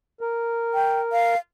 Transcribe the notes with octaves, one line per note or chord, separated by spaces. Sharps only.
A#4
G5
F5